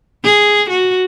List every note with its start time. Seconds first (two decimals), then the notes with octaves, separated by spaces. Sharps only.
0.24 G#4
0.69 F#4